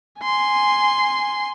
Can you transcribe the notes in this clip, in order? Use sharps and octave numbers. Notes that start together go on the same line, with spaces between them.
G#5 C6